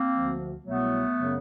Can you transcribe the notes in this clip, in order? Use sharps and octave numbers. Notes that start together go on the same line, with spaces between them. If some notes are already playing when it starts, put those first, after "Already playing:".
Already playing: A#3 C4
D2 D3 F3
C2 B2 F#3 A3 B3
F#2 C#3 F#3